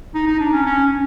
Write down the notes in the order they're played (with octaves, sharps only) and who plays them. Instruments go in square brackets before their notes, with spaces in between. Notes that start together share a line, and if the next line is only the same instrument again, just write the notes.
[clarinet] D#4
D#4
D4
C#4
C#4